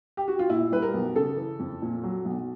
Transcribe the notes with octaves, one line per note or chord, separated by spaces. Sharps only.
G4
F#4
F4
A#2 E4
G3 B4
A#4
B1
C#3 A4
E3
F2
A#2
F#3
B1